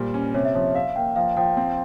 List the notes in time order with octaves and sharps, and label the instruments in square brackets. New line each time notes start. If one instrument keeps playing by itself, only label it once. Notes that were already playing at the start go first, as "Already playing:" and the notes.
Already playing: [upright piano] A#2 G3 [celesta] C5
[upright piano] C#4
[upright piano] C3 [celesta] C#5
[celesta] E5
[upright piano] F3 [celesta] C#5
[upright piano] E5 [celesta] F5
[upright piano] A#3 [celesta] G5
[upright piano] F3 [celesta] F5
[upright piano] F3 [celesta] G5
[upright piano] C4